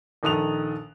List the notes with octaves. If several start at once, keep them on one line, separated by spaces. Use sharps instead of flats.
A#1 D#3 A4 D#6 F#6 F7